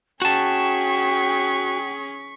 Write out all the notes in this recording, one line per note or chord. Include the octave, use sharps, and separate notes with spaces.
C#4 F#4 G#4 G5 A5 C#6 B6